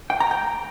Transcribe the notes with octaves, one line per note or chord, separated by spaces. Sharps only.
G5
A#5
G5